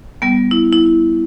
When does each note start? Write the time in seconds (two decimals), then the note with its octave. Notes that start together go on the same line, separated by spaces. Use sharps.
0.22 G3 B3
0.51 E4
0.72 E4